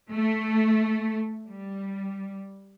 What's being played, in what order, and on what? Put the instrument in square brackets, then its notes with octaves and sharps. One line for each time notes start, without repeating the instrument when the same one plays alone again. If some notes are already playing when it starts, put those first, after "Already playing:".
[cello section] A3
G3